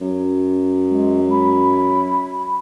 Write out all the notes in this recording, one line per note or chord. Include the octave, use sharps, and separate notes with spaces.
F#2
G#3
B5